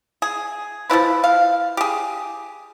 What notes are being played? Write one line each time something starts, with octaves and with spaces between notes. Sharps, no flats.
G#4
F3 G3 E4 B4
F5
G4 G#4